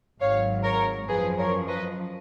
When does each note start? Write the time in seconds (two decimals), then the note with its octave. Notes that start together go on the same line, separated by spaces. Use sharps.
0.20 G#1 G#2 F#3 C#5 F5
0.64 A#4 C#5
1.09 F#2 F3 G#4 B4
1.38 A#4 C#5
1.68 B4 D#5